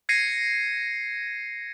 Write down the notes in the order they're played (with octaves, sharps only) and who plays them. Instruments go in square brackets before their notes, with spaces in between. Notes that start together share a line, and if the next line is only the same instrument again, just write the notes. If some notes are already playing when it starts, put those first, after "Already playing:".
[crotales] G#6 A#6 C7 C#7 D#7